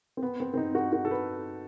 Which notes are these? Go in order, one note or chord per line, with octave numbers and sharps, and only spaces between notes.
C4
B3
C4
C4
D#4
F#4
F#4
A4
B4